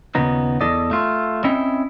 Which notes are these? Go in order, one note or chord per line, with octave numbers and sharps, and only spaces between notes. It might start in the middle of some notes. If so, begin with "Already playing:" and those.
D#2 A#2 C#3 B3 D#4
E2 E3 A4 D5 D#5
A3 F4
C4 C#4 E4 D#5 G5